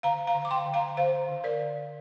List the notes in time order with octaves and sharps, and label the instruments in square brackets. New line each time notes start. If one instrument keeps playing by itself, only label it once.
[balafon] D3 F5 A#5
F5 A#5
D3
D6
G5 C6
D3
F5 A#5
D3 C5 F5
D3
A#4 D5
D3